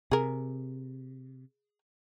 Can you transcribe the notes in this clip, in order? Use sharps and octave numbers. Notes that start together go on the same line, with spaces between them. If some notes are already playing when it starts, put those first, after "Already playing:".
C3 G#4 A#4